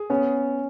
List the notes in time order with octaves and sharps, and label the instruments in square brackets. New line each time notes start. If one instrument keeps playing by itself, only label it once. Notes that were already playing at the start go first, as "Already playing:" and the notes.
Already playing: [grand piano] G#4
[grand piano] B3 [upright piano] C#4